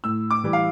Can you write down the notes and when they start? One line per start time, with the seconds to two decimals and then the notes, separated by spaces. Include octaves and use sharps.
0.04 A2 E6
0.31 D6
0.44 E3 G3
0.53 F5